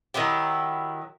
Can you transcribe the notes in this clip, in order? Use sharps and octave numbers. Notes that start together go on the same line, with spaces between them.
D#3 F#3 E4 G4